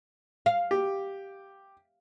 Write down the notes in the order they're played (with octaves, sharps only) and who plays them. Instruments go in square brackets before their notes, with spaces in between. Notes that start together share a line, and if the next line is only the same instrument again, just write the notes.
[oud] F5
[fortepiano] G4